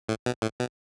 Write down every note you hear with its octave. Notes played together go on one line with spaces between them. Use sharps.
A2
B2
A2
B2